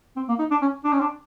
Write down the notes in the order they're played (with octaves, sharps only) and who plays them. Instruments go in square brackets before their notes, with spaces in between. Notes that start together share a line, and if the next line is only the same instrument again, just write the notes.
[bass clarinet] C4
A#3
D#4
D4
C#4
D4
C#4
D4